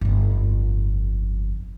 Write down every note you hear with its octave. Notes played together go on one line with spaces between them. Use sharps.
G1 F2